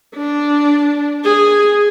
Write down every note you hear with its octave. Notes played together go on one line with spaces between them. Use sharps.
D4
G#4